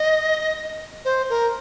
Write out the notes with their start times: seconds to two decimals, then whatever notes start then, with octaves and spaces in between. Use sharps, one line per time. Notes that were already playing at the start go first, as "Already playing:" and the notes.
Already playing: D#5
1.05 C5
1.30 A#4